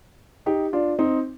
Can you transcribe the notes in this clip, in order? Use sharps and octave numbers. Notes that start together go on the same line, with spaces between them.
D#4 G4
D4 F4
C4 D#4